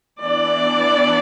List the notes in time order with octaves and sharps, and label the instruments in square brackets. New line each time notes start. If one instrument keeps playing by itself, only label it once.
[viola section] E3 B3 D4 D5